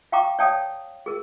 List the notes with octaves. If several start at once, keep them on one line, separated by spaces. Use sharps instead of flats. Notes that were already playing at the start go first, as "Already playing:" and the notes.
F5 G5 A#5 C#6 D6
C#5 D5 F5 G5 A5 D#6
G#4 A#4